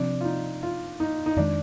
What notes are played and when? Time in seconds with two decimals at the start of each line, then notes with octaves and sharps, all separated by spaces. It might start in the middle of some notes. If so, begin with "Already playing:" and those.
Already playing: C3 F3 C4 D4
0.21 F4
0.25 D#4
0.63 F4
1.00 D#4
1.26 D#4
1.36 F2 D#3 G#3 D4